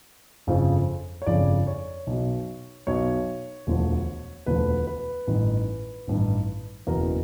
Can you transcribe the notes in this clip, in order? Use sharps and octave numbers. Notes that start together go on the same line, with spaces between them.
G1 F2 C#3 F3
C#5
G1 F2 C#3 F3 D5
C#5
B1 B2
B1 B2 C#5
E1 D2 D3 F3
E1 D2 D3 F3 B4
B4
A1 G2 D#3
A1 G2 D#3
F#1 E2 B2 A#4